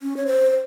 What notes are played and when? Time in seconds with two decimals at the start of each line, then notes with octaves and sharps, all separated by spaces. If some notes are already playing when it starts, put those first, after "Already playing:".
0.02 C#4
0.17 C#5
0.26 C5
0.50 C5